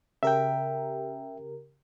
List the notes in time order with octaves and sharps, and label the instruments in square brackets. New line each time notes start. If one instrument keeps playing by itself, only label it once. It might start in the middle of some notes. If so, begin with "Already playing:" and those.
[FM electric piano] C#3 G4 A#4 [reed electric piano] E5 G5